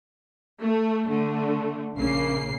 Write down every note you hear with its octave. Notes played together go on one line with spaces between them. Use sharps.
A3
D3 A3
A#1 C#3 A#3 C7